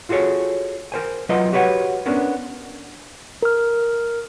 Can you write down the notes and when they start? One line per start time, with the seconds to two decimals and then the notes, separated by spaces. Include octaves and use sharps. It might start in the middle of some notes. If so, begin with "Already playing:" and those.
0.09 F4 F#4 G#4 A4 C#5
0.92 A#4 C5 G#5
1.29 F#3 F4 B4 D#5 F#5 A#5
1.53 F#4 G4 B4 C#5 F#5
2.06 B3 C#4 D4 A#4
3.42 A#4 F6